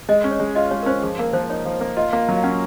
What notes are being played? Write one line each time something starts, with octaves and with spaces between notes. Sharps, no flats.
G#3 D#5
C#4
C#5
G#3
F4 D#5
G#3 C#5
A#4
C#4 C5
F3 G#4
A#3 A#4
F3 C5
D#4 C#5
F3
A#3
F4 D#5
A#3
F#3
F5
C#4 F#5